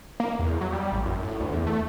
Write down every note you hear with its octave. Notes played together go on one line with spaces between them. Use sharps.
A#3
E2
F#3
G3
A1
F#2
A2
D2
E2
A3